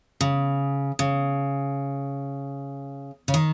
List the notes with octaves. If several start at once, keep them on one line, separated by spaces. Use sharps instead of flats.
C#3
C#3
C#3
D#3